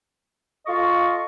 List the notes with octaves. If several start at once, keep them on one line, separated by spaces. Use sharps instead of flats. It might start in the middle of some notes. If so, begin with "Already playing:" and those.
F4 A4 D#5 F5 C#6